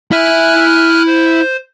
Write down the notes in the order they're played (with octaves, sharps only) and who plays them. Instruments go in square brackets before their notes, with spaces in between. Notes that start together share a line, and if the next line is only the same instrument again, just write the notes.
[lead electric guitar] E4 E5 [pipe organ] G#5 F6 F#6
[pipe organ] C5